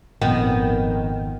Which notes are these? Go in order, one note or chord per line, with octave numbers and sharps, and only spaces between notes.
G#1 F2 A#2 D#3 B3 G5